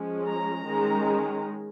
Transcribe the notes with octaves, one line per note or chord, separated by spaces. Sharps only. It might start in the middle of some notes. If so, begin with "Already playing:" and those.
Already playing: F3 G#3 C#4
A#5
D#3 G#3 C#4